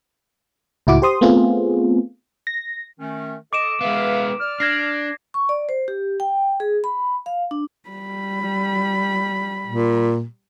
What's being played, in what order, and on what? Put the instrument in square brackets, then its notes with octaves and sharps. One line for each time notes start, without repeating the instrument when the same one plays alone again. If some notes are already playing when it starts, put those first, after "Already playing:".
[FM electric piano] C#2 A2 E4 F#4 D6
G4 C5 C6 D#6
A3 B3 C4 F4 G#4
A#6
[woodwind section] D#3 A3 C#4
[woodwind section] A4 D#5 [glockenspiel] D6 D7 E7
[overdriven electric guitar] G#3 B3 [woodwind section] B4 E5 F5
[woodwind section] D5 F6
[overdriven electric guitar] D4 [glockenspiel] G#6 A#6 C7
[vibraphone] C#6
D5
C5
G4
G5
G#4
B5
F5
D4
[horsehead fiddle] G3 B5
[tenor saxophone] A#2